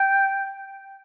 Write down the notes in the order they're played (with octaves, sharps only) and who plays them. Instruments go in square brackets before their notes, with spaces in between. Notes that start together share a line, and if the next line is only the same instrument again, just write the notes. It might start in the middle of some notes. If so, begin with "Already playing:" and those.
Already playing: [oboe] G5